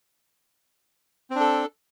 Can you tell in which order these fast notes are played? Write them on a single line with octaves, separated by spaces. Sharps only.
C4 D4 A4